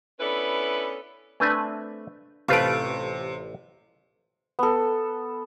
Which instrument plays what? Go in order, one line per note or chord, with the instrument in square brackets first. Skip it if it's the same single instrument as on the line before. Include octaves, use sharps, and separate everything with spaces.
[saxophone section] B3 C#4 D4 E4 A4 B4
[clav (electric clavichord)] A3 C4 E5 [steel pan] D4 B4 G#5
[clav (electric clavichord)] A1 A3 F4 [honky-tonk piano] C3 D7 [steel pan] A4 B4 F5
[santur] B3 A4